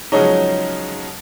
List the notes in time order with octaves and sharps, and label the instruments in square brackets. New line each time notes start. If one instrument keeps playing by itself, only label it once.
[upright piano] C#3 F3 F#3 G#3 C#4 D#4